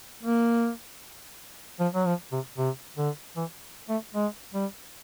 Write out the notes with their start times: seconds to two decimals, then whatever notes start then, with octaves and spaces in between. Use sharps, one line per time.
0.23 A#3
1.80 F3
1.94 F#3
2.06 F3
2.32 C3
2.58 C3
2.97 D3
3.36 E3
3.89 A3
4.15 G#3
4.54 G3